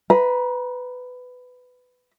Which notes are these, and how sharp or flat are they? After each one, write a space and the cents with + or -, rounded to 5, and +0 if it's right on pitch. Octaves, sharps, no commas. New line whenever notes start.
B4 +15 A#5 +35